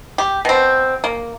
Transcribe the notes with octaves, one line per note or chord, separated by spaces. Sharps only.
G4
B2 C4
A#3